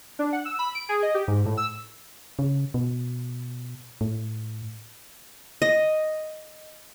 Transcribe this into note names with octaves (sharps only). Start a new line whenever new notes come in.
D4
F#5
E6
B5
D7
G#4
D#5
G4
G#2
A2
E6
C#3
B2
A2
D#5